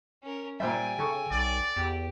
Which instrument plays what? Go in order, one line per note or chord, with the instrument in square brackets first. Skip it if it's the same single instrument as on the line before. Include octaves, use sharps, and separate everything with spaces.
[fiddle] C#4 A#4
[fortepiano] A#2 C5 E5 [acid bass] G3 [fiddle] G5 G#5
[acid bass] C#3 [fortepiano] A4 C#6
[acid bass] B1 [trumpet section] D5
[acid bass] E2 [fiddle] G4